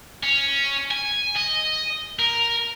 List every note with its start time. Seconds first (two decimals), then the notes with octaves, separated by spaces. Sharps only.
0.23 C#4
0.91 G#5
1.37 D#5
2.19 A#4